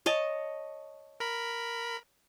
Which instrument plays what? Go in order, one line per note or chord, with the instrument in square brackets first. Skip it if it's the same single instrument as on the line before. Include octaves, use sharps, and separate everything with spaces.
[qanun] C#5 D#5 A5
[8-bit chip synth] A#4 B5